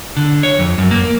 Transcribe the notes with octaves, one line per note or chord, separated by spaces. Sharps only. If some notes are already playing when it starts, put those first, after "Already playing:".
D3
C#5
F2
F#2
A#3